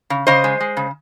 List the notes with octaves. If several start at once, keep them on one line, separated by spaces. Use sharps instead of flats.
C#3
C#3 C5 D#5
G#3
G#3
C#3